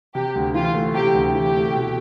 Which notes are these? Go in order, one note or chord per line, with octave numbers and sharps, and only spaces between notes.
C3 G4
D2
E3 F4
A3
C3 G4
D2
E3 G4
A3
B2